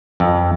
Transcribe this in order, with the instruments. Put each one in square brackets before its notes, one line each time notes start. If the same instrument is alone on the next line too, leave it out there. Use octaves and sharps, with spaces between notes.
[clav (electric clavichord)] F2